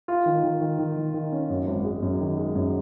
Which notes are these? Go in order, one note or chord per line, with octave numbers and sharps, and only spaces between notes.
F4
D#3
D#3
D#3
D#3
D#3
D#3
C#4
F#2
G#1
G#3
F#2
D#3
G#3
F#2